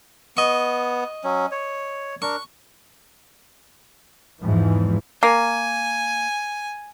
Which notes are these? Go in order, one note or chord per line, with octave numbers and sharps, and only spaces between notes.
B3 D#5 C#6
F#3 C#4
C#5
D4 A#4 C#6
E2 G#2 E3 F3
A#3 G#5